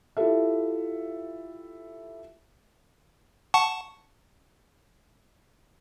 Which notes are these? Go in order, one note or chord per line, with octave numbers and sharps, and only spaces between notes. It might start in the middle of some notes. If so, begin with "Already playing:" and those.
E4 F4 G4 A4 E5
F#5 A5 C#6